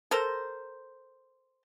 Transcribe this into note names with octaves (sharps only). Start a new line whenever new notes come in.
A4 A#4 C5